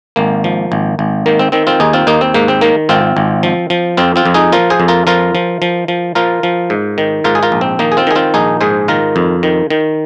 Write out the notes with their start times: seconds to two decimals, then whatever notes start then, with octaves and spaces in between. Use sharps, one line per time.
0.16 G#1 A#3
0.44 F3
0.72 G#1
0.99 G#1
1.26 D#3 A#3
1.39 C4
1.52 D#3 C4
1.67 C4 F4
1.80 D#2 D#4 G#4
1.93 C4 F4
2.07 D#2 A#3 D#4
2.21 C4
2.34 G#2 A#3
2.48 C4
2.61 D#3 A#3
2.89 G#1 C4 F4
3.17 G#1
3.43 F3
3.70 F3
3.97 F2 C4 F4
4.16 C4 F4
4.25 F2
4.34 D#4 G#4
4.52 F3 F4 A#4
4.70 G#4 C5
4.80 F2
4.88 F4 A#4
5.07 F3 F4 A#4
5.35 F3
5.62 F3
5.88 F3
6.15 F3 F4 A#4
6.43 F3
6.70 G#2
6.98 D#3
7.24 G#2 F4 A#4
7.35 G#4
7.43 F4 A#4
7.52 A#1
7.61 C4
7.79 D#3 A#3 D#4
7.92 G#4
7.97 C4 F4
8.07 D#3 G#4
8.15 C4 F4
8.34 A#1 D#4 G#4
8.61 G#2 G#4 C5
8.88 D#3 F4 A#4
9.16 F2
9.43 D#3
9.70 D#3